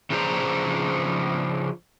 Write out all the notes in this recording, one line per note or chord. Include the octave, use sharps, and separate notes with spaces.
C#3 F3 D4 C5 A5 A#5